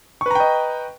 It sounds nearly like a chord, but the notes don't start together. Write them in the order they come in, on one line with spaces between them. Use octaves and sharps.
C#6 B4 A#5 G5 D#5